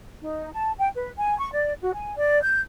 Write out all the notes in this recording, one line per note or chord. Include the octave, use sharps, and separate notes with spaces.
D#4
A5
G5
B4
G#5
C#6
D5
F#4
G#5
D5
G6